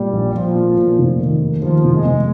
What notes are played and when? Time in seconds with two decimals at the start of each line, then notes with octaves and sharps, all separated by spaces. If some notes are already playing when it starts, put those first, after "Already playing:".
Already playing: A#2 G3
0.13 A#1
0.34 A#1 F3
0.55 A#2
0.77 A#2
0.99 F1
1.19 D#3
1.41 D#2
1.62 D#2 F3
1.85 F1
1.94 G#3
2.05 F1